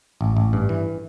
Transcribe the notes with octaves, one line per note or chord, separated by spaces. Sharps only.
A1
A1
G2
E3